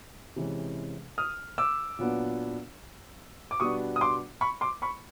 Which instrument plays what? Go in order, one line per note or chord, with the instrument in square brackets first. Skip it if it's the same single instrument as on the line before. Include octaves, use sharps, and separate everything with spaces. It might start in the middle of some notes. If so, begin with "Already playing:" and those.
[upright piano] C3 E3 G#3 C#4
D#6 F6
D6 E6
A#2 F#3 B3 D4
D6
B2 G3 B3 D4 C#6 D#6
D#6
C6 D6
B5 C#6
C6 D6
B5 C#6